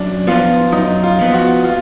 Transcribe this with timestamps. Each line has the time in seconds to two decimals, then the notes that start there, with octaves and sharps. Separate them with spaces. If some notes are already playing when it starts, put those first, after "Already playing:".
Already playing: F#2 D4
0.27 F3 B3 F4
0.72 F#2 D#4
1.03 F4
1.19 F3 B3
1.33 F#4
1.64 F4